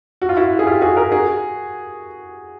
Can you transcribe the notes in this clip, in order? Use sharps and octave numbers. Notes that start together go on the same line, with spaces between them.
F#4
F4
E4 F#4
G#4
F4 G4
F#4 G#4
G#4 A#4
F#4 G#4